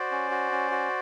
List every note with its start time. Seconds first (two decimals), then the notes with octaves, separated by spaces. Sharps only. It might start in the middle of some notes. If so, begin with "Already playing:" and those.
Already playing: F#4 C5 D5
0.11 C#4
0.31 F#4
0.52 C#4
0.71 F#4